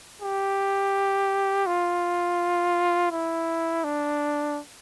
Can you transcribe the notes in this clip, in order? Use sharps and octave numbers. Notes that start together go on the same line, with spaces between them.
G4
F4
E4
D4